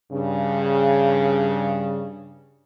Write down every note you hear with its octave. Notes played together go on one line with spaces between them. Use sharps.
G2 C#3